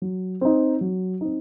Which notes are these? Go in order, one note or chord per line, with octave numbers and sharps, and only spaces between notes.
F#3
C4 D#4
F#3
C4 D#4